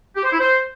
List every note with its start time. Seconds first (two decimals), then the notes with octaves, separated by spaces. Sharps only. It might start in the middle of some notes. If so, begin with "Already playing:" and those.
0.16 G4
0.24 C5
0.32 E4
0.40 C5